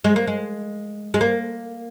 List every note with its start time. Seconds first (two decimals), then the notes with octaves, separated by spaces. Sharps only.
0.04 G#3
0.16 A#3
0.27 G#3
1.14 G#3
1.21 A#3